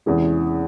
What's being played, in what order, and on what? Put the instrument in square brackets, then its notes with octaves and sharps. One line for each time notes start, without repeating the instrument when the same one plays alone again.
[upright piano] E2 C3 E3 G#3 C#4 G#4